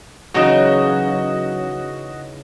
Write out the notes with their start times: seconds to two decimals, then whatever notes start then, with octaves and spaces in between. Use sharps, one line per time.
0.34 C#3 E3 F#3 D#4 F#4 D#5